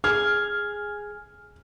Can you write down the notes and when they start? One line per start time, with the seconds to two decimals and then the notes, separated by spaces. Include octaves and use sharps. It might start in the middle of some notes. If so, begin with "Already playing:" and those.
0.04 G#4 F6